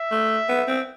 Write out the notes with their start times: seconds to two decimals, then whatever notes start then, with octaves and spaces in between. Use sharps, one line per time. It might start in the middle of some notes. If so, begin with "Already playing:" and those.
Already playing: E5
0.11 A3
0.49 B3
0.68 C4